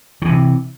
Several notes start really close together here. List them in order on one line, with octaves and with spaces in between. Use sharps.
D#3 E3 C3